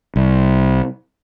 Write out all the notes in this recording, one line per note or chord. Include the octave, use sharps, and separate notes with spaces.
C2